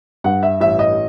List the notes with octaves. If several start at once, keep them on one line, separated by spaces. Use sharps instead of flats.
G2 F#5
E5
A1 E5
D#5